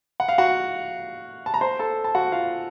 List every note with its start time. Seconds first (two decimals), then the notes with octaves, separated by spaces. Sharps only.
0.20 F#5
0.28 F5
0.38 F#4 F#5
1.46 A5
1.54 A#5
1.61 C5 C6
1.79 A4 A5
2.04 A5
2.15 F#4 F#5
2.32 F4 F5